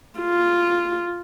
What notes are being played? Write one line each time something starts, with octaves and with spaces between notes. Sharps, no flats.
F4